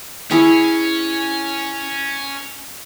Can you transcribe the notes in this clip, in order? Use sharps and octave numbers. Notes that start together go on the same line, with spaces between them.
C#4 E4 G#4 C#6